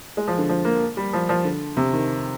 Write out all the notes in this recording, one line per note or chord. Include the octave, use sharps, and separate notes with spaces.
G#3
F3
D3
F3
A#3
G3
F3
F3
D3
C3
D#3